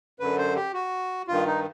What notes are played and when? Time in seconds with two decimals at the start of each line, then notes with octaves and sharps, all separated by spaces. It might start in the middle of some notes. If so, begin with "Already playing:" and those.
0.20 F#2 D3 B4
0.38 C5
0.56 G4
0.74 F#4
1.28 G2 D#3 F4
1.47 D#4